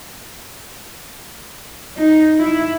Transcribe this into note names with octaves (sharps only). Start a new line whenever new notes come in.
D#4
E4